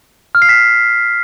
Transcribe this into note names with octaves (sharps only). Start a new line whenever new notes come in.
F6
C7
B6